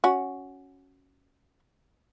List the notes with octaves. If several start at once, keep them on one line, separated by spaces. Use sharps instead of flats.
C#4 F#4